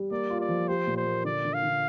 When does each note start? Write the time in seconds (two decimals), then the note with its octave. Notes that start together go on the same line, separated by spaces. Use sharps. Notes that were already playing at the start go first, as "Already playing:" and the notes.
Already playing: G3
0.11 A#3 D5
0.30 F4
0.40 D5
0.49 F3
0.68 G4 C5
0.87 A#2
0.97 C5
1.06 A#3
1.25 D3 D5
1.45 D3
1.54 F5
1.63 D3